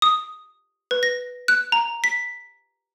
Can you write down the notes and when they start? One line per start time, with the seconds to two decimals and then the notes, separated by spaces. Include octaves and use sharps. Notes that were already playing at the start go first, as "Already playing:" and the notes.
0.02 D#6
0.91 B4
1.03 A#6
1.48 F#6
1.72 A#5
2.04 B6